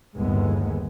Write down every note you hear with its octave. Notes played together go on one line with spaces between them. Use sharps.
G1 D#2 A2 G#3 B3